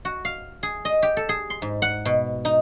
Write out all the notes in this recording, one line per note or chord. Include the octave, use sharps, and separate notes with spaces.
F#4
F5
G#4
D#5
G4
A4
G#4
C6
G#2
F#5
B2
D#4